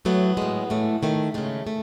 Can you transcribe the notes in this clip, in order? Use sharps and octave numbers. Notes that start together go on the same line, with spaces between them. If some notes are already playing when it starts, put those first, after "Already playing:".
A2 F#3 A3 B3
A2 G#3
A2 E3 A3
D#3 A3
C#3 G#3 A3
A3